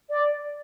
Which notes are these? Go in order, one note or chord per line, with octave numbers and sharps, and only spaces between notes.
D5